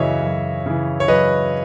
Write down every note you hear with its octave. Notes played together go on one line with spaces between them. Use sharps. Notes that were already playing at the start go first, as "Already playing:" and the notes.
Already playing: F#2 C#3 E3 C#5 D#5 E5
F#2
C#3 E3
C#5
F#2 B4 D#5